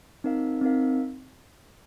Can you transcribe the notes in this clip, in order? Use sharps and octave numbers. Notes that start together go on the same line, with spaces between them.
C4 D#4 A#4 F5
C4 D#4 A#4 F5